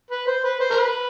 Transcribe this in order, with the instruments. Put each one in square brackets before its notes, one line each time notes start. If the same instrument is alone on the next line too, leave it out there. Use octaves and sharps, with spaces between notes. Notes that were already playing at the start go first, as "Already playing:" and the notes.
[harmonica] B4
C5
B4
C5
A#4
B4